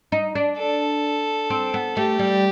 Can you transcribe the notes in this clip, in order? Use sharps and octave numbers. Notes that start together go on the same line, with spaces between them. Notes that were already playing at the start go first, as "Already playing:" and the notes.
D#4
D4
A4
C4
B3
A3 G4
G3